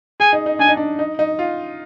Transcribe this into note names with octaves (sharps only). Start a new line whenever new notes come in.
G#4 G#5
D#4
D#4
D4 G#5
D#4
D4
D#4
D#4
F4